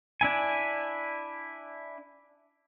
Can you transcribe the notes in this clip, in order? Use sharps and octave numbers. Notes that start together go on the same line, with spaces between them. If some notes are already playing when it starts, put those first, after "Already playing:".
D4 E4 G#5